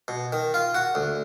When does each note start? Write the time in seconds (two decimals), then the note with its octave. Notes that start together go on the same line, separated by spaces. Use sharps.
0.08 B2
0.33 D#3
0.54 F4
0.74 F#4
0.95 D2